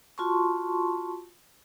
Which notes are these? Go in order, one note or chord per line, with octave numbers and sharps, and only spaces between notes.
F4 F#4 A5 C6 C#6